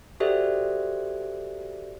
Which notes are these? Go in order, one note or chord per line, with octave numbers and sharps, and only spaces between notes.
F#4 G4 A4 C5 D5 E5